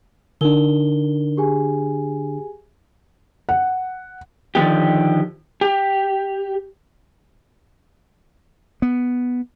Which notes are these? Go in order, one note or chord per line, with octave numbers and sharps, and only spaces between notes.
D3 D4 D#4 A#4 G7
G4 G#4 G#5
F#5
D3 D#3 F3 B3 G4
G4
B3